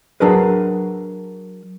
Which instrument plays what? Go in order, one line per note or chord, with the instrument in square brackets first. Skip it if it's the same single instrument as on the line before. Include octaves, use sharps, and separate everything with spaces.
[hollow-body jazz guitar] F#3 D4 G#4 A#4 B4